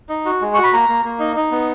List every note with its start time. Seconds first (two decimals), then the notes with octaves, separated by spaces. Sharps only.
0.09 D#4
0.26 F#4
0.41 G#3
0.54 F#4 C#6
0.63 B5
0.73 A#3 A#5
0.89 A#3
1.05 A#3
1.19 D#4
1.36 D#4
1.51 B3